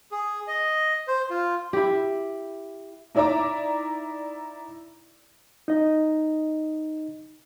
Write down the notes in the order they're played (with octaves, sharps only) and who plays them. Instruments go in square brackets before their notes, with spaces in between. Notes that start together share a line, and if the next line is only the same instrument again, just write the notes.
[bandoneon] G#4
D#5
C5
F4
[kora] E4 G4
[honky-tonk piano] D#4 E4 D5 E5 A#5 D6
[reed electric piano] D#4 D#5